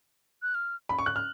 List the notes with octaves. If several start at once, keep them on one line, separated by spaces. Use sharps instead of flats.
F#6
F6
B5
C#6
F#6
F6